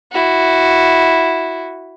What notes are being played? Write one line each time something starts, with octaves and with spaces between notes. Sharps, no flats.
E4 F#4